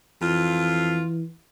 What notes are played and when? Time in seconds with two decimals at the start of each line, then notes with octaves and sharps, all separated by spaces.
0.22 F2 E3 F4